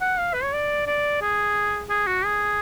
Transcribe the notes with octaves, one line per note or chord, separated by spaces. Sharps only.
F#5
F5
B4
C#5
D5
D5
G#4
G#4
F#4
G#4